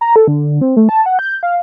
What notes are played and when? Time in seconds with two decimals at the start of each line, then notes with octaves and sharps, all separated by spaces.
0.01 A#5
0.16 A4
0.27 D3
0.61 C4
0.77 A3
0.89 A5
1.06 F#5
1.19 G6
1.43 F5